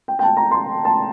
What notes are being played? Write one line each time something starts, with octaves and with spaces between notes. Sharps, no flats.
G5
G5
A5
A#5
C6
A5